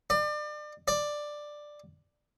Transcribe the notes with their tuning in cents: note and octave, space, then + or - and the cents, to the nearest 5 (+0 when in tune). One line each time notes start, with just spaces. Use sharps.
D5 +35
D5 +10